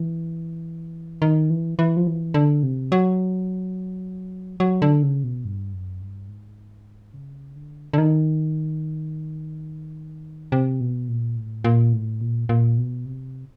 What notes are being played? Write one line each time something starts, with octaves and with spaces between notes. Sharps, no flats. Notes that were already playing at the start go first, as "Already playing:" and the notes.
Already playing: E3
D#3
E3
E3
F3
E3
D3
C3
F#3
F#3
D3
C#3
B2
G2
F#2
G2
G#2
C#3
D3
D3
D#3
C3
B2
A#2
A2
A#2
A2
A#2
A#2
B2
C3